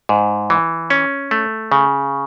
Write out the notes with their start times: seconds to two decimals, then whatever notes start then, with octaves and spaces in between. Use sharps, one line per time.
0.09 G#2
0.50 E3
0.90 C#4
1.31 A3
1.72 C#3